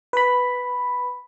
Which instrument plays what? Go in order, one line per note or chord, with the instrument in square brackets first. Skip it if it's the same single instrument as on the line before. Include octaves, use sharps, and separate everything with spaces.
[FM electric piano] B4 B5